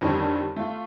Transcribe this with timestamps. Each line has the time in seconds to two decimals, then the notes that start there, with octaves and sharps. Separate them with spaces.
0.01 F2 D3 D#3 G3 C#4 D#4
0.56 A3 F4